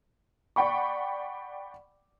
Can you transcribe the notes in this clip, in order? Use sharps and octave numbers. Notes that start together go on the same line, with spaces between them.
D5 F#5 G5 B5 C#6